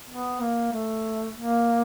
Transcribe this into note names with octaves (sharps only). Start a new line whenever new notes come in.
B3
A#3
A3
A#3